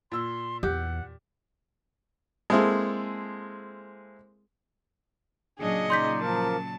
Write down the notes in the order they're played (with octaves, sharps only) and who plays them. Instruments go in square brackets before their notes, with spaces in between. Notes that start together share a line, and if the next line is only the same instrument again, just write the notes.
[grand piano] A#2 E6 [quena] C6
[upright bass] E2 [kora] G4 [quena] F#5
[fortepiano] G#3 A#3 C4 E4 G#4 A4
[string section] A#2 C#3 F#3 [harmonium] D4 [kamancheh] G#4 D#5
[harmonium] D#4 D5 [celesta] C6 G6 B6
[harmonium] F3 A#3 A#4 [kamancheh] A5